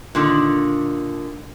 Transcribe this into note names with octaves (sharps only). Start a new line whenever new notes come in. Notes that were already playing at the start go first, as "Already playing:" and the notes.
A#2 D3 D#3